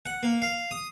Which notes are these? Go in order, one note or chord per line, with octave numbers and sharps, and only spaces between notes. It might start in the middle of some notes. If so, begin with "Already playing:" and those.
F#5
A#3
F5
D#6